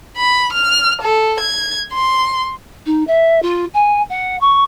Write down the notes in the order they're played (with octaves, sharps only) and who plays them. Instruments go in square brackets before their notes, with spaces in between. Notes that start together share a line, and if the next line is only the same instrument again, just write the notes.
[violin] B5
F6
A4
G#6
C6
[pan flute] D#4
E5
F4
G#5
F#5
C#6